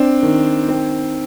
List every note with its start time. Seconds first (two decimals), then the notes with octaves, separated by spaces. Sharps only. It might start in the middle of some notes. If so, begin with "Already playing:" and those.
Already playing: C4 D4
0.22 D#3
0.69 C4